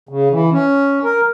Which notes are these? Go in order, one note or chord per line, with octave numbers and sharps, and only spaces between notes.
C#3
E3
C#4
A#4